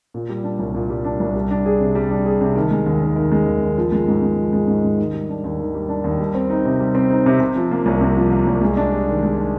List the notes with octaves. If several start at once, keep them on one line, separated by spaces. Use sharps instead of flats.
A#2
G3
D4
C2
A#2
G3
D4
C2
G3
D4
G#4
C3
G3
D4
G#4
C3
D#3
G#3
D#2
D#2
D#3
G#3
D#2
D#2
F3
G#3
G#2
G#2
F3
G#3
G#2
G#2
D#3
G3
D4
D#2
D#3
G3
D4
D#2
G3
C4
D#4
C3
G3
C4
D#4
C3
C3
F3
A#3
C2
C3
F3
A#3
C2
G#3
D4
G4
D#3
G#3
D4